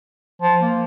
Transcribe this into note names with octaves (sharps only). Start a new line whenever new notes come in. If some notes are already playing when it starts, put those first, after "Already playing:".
F3
A#3